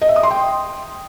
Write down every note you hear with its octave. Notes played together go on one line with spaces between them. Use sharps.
D#5
E5
D#6
C6
G5